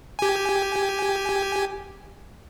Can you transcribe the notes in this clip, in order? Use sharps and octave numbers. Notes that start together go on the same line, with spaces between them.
G4 G#5